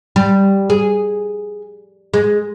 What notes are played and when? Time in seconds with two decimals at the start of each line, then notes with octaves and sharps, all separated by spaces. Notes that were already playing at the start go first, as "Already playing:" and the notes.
0.16 G3
0.70 G#4
2.14 G#3